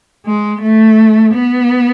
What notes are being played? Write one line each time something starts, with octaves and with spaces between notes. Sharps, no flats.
G#3
A3
B3